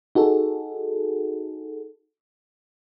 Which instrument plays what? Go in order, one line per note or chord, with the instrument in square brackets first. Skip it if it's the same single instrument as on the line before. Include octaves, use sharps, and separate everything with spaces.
[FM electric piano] D#4 F#4 G#4 A4